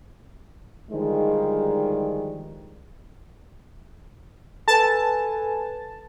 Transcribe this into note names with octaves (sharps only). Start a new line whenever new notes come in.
D3 D#3 F3 G3 G#3
A4 B4 G#5 A5